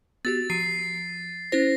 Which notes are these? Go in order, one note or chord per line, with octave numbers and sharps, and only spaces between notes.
B3 F#4 G4 A6
F3 C7 D7 D#7
C#4 E4 C5 A#6